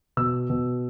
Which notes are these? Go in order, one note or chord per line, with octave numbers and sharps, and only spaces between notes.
B2 E6
B2